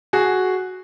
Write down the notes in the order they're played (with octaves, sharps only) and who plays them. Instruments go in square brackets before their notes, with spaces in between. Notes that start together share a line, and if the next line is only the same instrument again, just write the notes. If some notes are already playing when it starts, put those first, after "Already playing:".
[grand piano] F#4 G#4